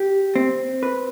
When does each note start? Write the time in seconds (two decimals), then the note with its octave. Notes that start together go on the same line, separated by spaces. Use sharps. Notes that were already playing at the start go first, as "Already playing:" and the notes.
Already playing: G4
0.36 C4
0.83 B4